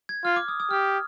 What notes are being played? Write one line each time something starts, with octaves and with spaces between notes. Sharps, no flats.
G#6
F4 F6
D6
D#6
D#6
G4 F6